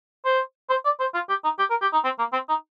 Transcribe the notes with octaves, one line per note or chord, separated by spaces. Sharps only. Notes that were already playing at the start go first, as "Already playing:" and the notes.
C5
C5
D5
C5
F4
G4
D#4
G4
A#4
G4
D#4
C4
A#3
C4
D#4